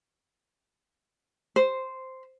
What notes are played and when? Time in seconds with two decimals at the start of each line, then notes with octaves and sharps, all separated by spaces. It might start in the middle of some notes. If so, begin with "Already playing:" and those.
1.56 C5